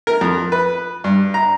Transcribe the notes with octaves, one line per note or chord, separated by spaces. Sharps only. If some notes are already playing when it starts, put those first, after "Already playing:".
A#4
F2
B4
G2
A#5